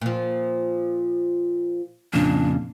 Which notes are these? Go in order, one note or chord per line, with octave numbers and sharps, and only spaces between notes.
A#2 F3
F2 A#2 C#3 D4